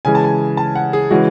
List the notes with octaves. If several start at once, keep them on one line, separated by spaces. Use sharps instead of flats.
C#3 E3 G#3 G#5
A5
G#5
A5
F#5
G#4
C#3 E3 G#3 F#4